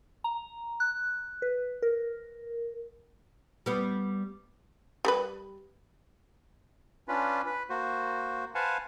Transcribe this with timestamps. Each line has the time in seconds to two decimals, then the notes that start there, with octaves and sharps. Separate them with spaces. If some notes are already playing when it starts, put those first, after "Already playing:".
0.24 A#5
0.80 F#6
1.42 B4
1.82 A#4
3.66 G3 B3
5.05 G3 A#4 B4
7.08 C#4 D4 F4 B4
7.46 B4
7.70 A#3 F#4 C5
8.55 B4 C5 F5 F#5 G#5 A5